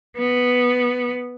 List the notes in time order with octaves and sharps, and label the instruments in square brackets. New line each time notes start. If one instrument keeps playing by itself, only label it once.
[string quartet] B3